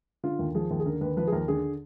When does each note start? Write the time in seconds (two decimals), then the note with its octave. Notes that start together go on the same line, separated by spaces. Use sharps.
0.23 D3 F4
0.39 D#2
0.55 F3 G#4
0.71 D#2
0.80 G#4
0.86 D3 A#4
1.01 D#2 B4
1.17 F3 B4
1.27 G#4
1.32 D#2 A#4
1.48 D3 G#4